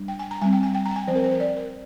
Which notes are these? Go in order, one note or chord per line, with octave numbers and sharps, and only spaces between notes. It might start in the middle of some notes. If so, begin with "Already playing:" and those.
Already playing: G3 D4
G5
G#5
A#5
G3 C4 G#5
G5
G#5
G5
A#5
G5
G#5
F3 C4 A#4 C5
C5
A#4
D5
A#4